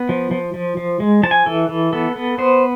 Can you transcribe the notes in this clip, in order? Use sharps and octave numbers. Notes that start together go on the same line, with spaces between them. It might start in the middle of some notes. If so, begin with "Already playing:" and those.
Already playing: B3
F3
F3
F3
F3
G#3
F3 A5
G#5
E3 A4
E3
B3 A4
B3
B3 C5